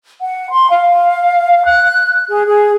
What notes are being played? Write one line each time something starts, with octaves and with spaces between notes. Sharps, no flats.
F#5
C6
F5
F#6
G#4
G#4